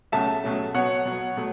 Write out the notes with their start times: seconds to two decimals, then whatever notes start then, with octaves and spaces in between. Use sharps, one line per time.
0.12 C#2 B2 F#3 A3 E5 A5
0.44 C#2 B2 F#3 A3
0.75 B2 F#3 B3 C#5 F#5
1.05 B2 F#3 B3
1.37 B2 F#3 A3